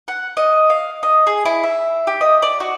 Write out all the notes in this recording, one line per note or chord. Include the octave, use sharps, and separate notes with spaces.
F#5
D#5
F5
D#5
G#4
E4
E5
G4
D#5
D5
F#4